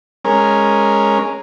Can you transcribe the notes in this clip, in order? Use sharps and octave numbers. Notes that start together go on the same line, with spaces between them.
G#3 C#4 A#4